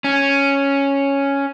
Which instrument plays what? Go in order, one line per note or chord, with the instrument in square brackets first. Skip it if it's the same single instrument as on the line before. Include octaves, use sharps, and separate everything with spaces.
[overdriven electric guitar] C#4